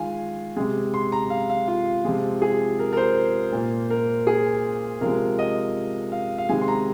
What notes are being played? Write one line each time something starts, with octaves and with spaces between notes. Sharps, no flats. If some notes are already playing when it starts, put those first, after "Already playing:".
Already playing: D#3 G#3 F4 F5 G#5
C3 G#3
C6
A#5
F5
F5
F4
C3 F3 G#3
G#4
A#4
A#4
C5
A#2 A#3
A#4
G#4
C3 F3 G#3 A#4
D#5
F5
F5
C3 D#3 G#3 G#5
C6
A#5